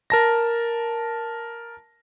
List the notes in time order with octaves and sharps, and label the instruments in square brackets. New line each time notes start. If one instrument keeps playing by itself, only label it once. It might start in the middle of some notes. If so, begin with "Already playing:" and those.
[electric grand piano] A#4 A5 A#6